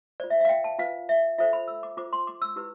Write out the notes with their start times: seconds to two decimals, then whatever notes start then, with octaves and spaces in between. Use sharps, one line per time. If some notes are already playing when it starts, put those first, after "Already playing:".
0.20 F4 C5 D5
0.30 E5
0.40 E5 F5
0.49 G5
0.64 A5
0.79 F4 B4 F5
1.09 E5
1.38 F4 A4 C5 E5
1.53 B5
1.68 E6
1.83 D6
1.97 F4 C5 D6
2.13 C6
2.27 D6
2.42 E6
2.56 E4 G4 B4 E6